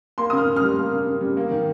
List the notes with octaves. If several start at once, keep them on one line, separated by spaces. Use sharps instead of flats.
A#3 C6
C#3 D#6
F6
C#3
G3 F6
A#3
C#3
C#3
G3
A#3
D#3